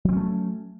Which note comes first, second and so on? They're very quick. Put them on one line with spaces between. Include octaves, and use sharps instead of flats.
F#3 C4 C#4 A3